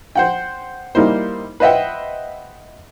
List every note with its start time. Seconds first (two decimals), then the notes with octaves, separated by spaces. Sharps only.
0.16 C5 F#5 G5
0.95 G3 A#3 D#4 E4 C5
1.60 B4 C5 D#5 E5 F#5 G5